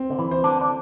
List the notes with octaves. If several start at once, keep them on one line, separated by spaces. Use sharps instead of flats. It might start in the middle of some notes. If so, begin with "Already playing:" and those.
Already playing: C4
D3
E3
C5
D3 D4
D4